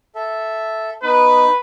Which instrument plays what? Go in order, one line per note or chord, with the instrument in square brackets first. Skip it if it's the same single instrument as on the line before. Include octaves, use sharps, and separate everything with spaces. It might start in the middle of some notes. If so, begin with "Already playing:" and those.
[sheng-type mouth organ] A4 E5
[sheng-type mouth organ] B3 D#4 [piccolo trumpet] B4